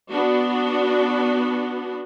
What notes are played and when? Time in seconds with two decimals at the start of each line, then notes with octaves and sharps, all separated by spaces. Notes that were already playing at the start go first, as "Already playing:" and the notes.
0.10 B3 D4 F#4